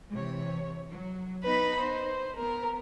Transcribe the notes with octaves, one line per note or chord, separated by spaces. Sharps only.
C3 E3 C#5
F#3
B3 D#4 B4 B5
C5
B3 A#4